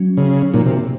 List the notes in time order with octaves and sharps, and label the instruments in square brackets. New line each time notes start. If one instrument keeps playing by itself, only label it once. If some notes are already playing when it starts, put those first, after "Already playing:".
Already playing: [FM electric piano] F#3 C#4 F#4
[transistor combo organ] C#3
[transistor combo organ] A#2 [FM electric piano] F3 C4 D#4 F#4
[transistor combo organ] C3